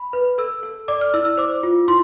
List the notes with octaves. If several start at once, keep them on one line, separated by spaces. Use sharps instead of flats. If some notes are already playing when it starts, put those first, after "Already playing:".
Already playing: B5
B4
A4 E6
A4
D5 D6
F6
E4 E6
E6
C5 D6
F4
E4 C6